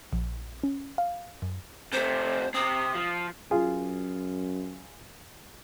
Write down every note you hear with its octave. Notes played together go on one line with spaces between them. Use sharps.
A#1
C#4
F5
F#2
C3 A3 C5
C3 C4 D#6
F3
F#2 F4 G#4